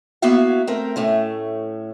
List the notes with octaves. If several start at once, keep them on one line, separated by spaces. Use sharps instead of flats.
A#3 B3 E4 F#4 E5 F5
A3 C4 A#4
A2 A3 C#4